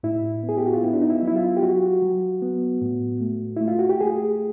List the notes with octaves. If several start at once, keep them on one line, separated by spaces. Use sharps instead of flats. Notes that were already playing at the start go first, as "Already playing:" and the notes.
A2 E4
B3
G#4
G4
F#4
F4
B3 E4
D4
D#4
E4
F#3
E4
F4
G4
F#3 F#4
F#3
B3
A2
A3
A3 E4
F4
F#4
G4
A3 G#4